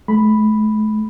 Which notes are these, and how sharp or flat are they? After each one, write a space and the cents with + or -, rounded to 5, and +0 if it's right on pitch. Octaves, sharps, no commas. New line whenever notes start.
A3 -40 B5 +0